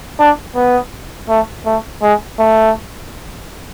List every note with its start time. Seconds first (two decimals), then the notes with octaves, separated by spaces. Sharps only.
0.19 D4
0.56 B3
1.29 A3
1.66 A3
2.02 G#3
2.39 A3